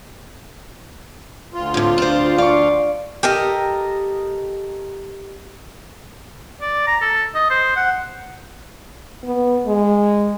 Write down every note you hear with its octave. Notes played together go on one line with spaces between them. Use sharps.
D2 F4
A2 C3
D4 C5
D5 F5 C#6
G4 A4 A#4 D#5
D5
A#5
A4
D#5
C5
F#5
B3
G#3